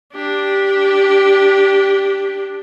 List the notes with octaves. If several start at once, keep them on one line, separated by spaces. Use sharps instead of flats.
D4 G4